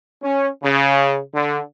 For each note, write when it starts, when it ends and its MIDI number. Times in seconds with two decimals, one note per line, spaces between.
0.22 0.47 61
0.63 1.18 49
1.34 1.59 50